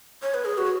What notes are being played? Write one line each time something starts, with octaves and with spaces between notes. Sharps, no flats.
C#5
B4
G#4
F#4